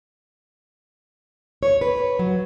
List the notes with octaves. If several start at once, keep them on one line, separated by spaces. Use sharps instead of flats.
C#5
B4
F#3